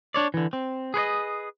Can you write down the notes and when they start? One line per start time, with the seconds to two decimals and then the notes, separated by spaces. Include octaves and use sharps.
0.14 D4 C#5 D5
0.34 D3 E3
0.53 C4
0.94 G#4 B4 C#5 D#5